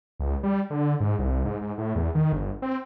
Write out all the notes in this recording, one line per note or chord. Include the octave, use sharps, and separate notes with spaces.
C#2
G3
D3
G#2
C2
G#2
G#2
A2
E2
D#3
G1
C4